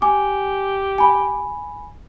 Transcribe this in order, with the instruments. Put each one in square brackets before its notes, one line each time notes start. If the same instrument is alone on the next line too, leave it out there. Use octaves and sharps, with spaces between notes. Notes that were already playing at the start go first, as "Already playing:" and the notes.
[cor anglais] G4 [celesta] G#5 D6
[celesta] G#5 B5